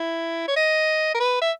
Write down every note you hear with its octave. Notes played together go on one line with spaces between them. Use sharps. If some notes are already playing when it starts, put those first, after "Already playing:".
Already playing: E4
C#5
D#5
A#4
B4
E5